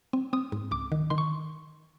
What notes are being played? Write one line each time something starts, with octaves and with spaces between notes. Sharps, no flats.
C4
C4 D#6
G#2
C#2 D6
D#3
D#3 C6
C#6